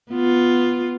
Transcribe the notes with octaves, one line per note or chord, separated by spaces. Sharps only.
B3 F4